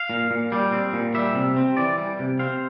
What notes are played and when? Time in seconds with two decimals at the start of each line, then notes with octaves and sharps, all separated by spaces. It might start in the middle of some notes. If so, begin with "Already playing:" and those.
Already playing: F5
0.10 A#2
0.31 A#2
0.52 G3
0.72 C4
0.93 A#2
1.14 G3 E5
1.35 C3
1.57 C4
1.77 E3 D5
1.98 G3
2.19 C3
2.39 C4 F5